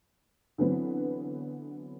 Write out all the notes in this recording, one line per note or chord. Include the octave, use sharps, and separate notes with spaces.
D3 E3 F#3 B3 C4